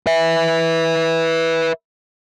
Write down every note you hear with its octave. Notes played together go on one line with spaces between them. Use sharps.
B4 E5